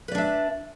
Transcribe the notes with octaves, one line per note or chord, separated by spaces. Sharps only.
D4 B4 D5 E5